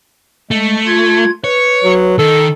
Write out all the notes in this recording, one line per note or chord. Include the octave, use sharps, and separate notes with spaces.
G#3 A3
F4 G#6
B4 C#5
F#3
D#3 A4